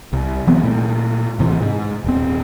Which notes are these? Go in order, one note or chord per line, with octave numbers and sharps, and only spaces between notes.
C2
E3 F#3 B3 C4
A#2 A3
A1 C3 E3
G#2
D#1 C4